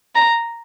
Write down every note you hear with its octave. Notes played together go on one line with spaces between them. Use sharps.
A#5